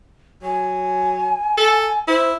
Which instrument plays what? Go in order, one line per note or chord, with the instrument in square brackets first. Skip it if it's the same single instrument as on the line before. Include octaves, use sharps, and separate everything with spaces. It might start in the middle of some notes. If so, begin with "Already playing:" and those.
[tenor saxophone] F#3 [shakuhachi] G#5
[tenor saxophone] A4
[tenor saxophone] E4 [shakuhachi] C5